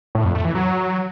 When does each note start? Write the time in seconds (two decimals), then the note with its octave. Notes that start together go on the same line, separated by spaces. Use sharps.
0.15 A2
0.25 F2
0.35 A3
0.45 E3
0.55 F#3